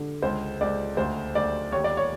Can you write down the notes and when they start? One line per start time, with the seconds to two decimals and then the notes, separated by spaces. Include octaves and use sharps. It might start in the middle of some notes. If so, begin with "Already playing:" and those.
Already playing: D3
0.22 C#2 C5
0.61 C#2 D5
0.97 D2 C5
1.35 D2 D5
1.72 D#2 C#5
1.84 D5
1.97 C#5